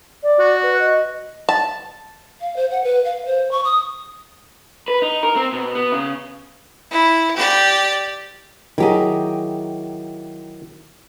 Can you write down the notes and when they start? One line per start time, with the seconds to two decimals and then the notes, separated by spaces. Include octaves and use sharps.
0.23 D5
0.39 F#4
0.63 B4
0.80 D#5
1.49 A5
2.41 F5
2.56 C5
2.71 F#5
2.84 B4
3.04 F5
3.26 C5
3.51 C#6
3.65 D#6
4.88 B4
5.02 D#4
5.23 A#4
5.36 C4
5.53 B2
5.75 B3
5.92 C#3
6.91 E4
7.36 G4 D5
8.78 D#3 F#3 E4 G4 G#4 A#5